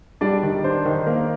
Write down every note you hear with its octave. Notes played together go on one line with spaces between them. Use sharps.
G3 D4 D5
D#3
D4 C5
D#3
C5
A#3 A#4